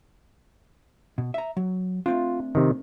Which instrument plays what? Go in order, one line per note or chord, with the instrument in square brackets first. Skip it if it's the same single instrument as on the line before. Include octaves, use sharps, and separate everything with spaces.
[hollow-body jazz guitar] B2
E5 A#5
F#3
[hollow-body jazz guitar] A3 C4 D4 [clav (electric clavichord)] F4
[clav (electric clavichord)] C3 D#3